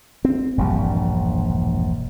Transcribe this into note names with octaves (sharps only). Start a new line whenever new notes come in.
C4
E1 A#1 G2 G3